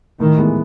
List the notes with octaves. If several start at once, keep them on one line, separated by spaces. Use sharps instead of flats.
A2 D#3
E3 G#3 B3